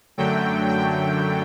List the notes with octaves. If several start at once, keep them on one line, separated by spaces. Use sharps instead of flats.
F#2 D3 F#3 A3 G5
G5